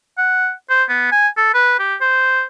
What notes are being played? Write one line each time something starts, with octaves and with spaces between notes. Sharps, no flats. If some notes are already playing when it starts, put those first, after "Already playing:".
F#5
C5
B3
G#5
A4
B4
G4
C5